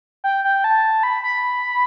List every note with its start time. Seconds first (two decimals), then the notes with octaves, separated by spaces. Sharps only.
0.24 G5
0.44 G5
0.64 A5
1.03 B5
1.24 B5